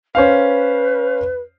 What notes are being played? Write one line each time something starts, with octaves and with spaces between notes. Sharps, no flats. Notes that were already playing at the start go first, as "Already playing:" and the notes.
C#4 B4 C5 F5